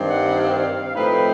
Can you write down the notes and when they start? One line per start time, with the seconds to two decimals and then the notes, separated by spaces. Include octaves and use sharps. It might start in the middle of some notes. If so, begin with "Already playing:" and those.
Already playing: G2 D#3 G3 C4
0.08 F#5
0.38 F5
0.96 A2 F3 A3 C4 D#4 B4